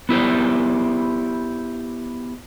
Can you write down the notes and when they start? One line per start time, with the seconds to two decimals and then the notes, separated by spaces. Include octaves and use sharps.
0.09 B3 E4 G4 C5